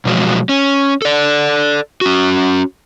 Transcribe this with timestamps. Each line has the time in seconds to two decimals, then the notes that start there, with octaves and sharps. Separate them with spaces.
0.05 B2 F3 F#3 G#3
0.49 C#4
1.02 A4 D5
2.01 C#4 F#4